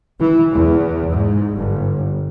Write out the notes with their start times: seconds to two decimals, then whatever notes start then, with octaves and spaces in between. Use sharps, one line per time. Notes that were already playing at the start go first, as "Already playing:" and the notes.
0.19 E3
0.53 E2
1.11 G#2
1.53 G1